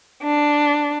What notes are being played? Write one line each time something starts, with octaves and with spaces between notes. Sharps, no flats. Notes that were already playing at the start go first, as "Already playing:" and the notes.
D4